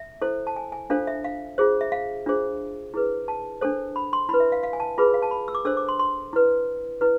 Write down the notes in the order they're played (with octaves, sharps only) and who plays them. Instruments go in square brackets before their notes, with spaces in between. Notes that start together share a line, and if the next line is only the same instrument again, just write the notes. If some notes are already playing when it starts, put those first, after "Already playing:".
Already playing: [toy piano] E5
E4 A4 C5
A5
G#5
G#5
D4 F4 A4 C5 F5
E5
F5
F4 G#4 C5
E5
F5
D4 F4 G#4 C5
E4 G#4 B4
A5
D4 A4 C5
B5
C6
E4 B4 B5
E5
F5
F5
G#5
A5
F4 G#4 B4 B5
F5
A5
B5
E6
D6
D4 A4 C5 E6
D6
C6
C6
E4 B4
E4 B4